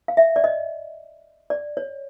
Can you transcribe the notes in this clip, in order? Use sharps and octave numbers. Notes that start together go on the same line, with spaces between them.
F5
E5
D5
D#5
D5
C#5